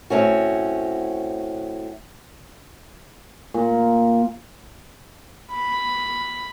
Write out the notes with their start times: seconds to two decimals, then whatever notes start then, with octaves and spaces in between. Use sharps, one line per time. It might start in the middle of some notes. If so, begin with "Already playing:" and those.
0.10 A2 C4 C#4 F#4
3.54 A#2
5.52 B5